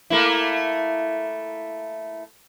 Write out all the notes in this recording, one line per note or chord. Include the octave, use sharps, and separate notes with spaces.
A3 A#3 E4